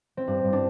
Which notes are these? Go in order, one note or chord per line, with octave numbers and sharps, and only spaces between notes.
C4
G2 D4
G2
D4